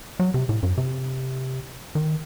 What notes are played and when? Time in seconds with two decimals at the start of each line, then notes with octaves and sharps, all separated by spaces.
0.20 F#3
0.34 C3
0.49 A2
0.63 F#2
0.77 C3
1.95 D#3